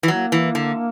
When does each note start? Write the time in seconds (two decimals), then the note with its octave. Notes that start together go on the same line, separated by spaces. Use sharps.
0.03 E3
0.08 F#3 A#3
0.32 E3
0.55 D3